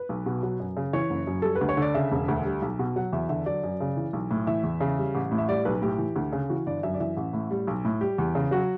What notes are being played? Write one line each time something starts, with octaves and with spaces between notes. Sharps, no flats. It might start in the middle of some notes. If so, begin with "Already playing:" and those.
Already playing: B4
B1
B2
F#3
F#2
C#3
E3 C#5
F#1
F#2
G3 A4
B4
D2
C#5
D3 D5
C#3 E5
E1
D2
G3
B1
B2
F#3 F#5
E2 E5
D3 E5
F#3 D5
F#2
C#3
E3
B1
A2
E3 E5
E2
C#3
G3
A1
A2
E5
G3 D5
B1 B4
A2 G4
E3
D2
C#3
E3 F#4
G1 D5
F#2 E5
D5
E3 E5
A1
A2
G3
B1
A2
G3 G4
E2
C#3
F#3 F#4